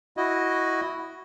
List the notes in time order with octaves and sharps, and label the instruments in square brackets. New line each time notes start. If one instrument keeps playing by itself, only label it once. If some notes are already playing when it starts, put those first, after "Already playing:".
[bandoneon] E4 F#4 D#5